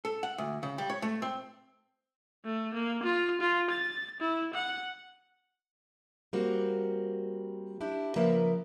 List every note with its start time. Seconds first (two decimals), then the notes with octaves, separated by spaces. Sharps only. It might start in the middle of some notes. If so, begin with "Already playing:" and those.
0.05 A4
0.23 F#5
0.38 D2
0.63 C#3
0.78 G3
0.90 C#5
1.02 A3
1.22 C4
2.45 A3
2.74 A#3
3.03 F4
3.41 F4
3.70 A6
4.20 E4
4.54 F#5
6.33 G3 A#3 C4 F#4
7.81 D4 E4 G4
8.16 C#3 F3 A#3 A#4 B4 E5